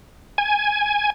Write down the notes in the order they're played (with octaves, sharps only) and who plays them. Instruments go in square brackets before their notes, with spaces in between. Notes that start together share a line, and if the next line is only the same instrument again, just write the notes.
[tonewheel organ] G#5